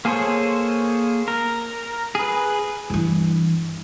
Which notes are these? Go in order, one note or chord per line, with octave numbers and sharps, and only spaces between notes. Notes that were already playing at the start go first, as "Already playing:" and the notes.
A#3 G#4 A4 C5 C#5
A#4
G#4 B4
G2 E3